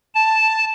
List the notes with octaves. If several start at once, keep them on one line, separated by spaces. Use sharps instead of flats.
A5